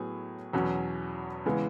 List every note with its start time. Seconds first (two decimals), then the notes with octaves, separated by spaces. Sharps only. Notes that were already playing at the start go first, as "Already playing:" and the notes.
Already playing: A2 F#3 B3 G#4
0.53 E2 B2 F#3 C#4
1.46 C#3 E3 G#3 B3